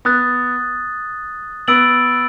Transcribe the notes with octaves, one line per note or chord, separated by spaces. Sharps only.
B3 D#6 F#6 A6
B3 B5 E6 A6 D7 F#7